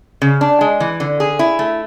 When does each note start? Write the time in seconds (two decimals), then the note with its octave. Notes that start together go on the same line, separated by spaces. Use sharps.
0.22 C#3
0.41 D4
0.61 G#3
0.80 E3
1.00 D3
1.20 G#4
1.39 E4
1.59 A3